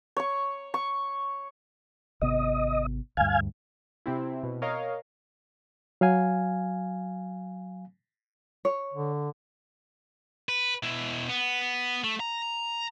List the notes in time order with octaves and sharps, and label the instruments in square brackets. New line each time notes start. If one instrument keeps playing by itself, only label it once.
[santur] C#5 C#6
C#6
[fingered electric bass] G#1 C3 B3 [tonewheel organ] D#5
[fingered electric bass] D2 G2 [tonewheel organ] F5 G#5
[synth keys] C3 C4 E4
B2
A#4 C#5 D#5 F5
[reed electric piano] F#3 F5 G#5
[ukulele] C#5
[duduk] D3
[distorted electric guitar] B4
B2 E4
B3
A3
A#5